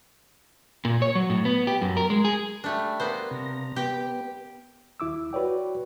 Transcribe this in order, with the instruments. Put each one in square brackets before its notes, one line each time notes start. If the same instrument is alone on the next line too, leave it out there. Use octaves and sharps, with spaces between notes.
[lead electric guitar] A#2
C#5
F#3
A2
B3
G4
F#2
A#4
G#3
G#4
[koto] G3 A3 D4
A#3 B3 C5
[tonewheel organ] C3 A#5
[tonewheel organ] B3 [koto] G4 G5
[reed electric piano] D#2 E4 D6 E6
F#4 B4 C#5 D5 G5